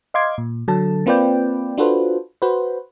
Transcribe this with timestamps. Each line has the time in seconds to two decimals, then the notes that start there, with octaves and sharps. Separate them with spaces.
0.14 D#5 F5 C6 D6 G#6
0.38 A#2
0.68 D3 F#3 A4 A5
1.06 A#3 C4 F4 B4 D5 G5
1.78 D4 F4 F#4 A4 B4 C5
2.42 F#4 B4 C5